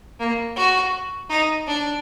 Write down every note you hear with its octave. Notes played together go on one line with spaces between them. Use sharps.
A#3
F#4
D#4
D4